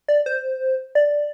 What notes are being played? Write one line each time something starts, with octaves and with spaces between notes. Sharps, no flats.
D5
C5
D5